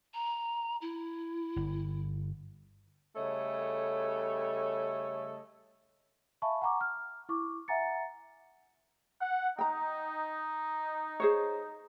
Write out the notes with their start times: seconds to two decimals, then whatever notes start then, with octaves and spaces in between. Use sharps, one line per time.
0.14 A#5
0.81 E4
1.56 G1
3.16 C#3 G3 A3 A4 C#5 D#5
6.42 E5 F5 G#5 A5 B5 C#6
6.62 F#5 G#5 A#5 C#6 D6
6.81 F6
7.29 E4 C#6 D6
7.68 E5 F#5 G#5 A#5 A6 C#7
9.20 F#5
9.59 D#4 G5 A#5
11.20 G#4 C5 C#5